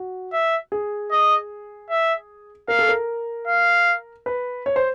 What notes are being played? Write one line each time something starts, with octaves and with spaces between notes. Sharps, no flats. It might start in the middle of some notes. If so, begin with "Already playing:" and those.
Already playing: F#4
E5
G#4
D#5
E5
A#4 F5
A4
A#4
F5
B4
C#5
C5